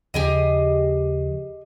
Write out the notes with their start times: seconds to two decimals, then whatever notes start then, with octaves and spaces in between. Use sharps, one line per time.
0.14 D#2 C#3 F3 G4 G#4 D#5